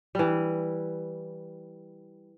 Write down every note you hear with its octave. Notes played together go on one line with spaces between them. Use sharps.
E3 G3